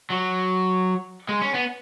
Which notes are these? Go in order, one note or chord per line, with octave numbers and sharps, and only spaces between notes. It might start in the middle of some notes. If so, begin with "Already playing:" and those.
F#3
G#3
C#4
B3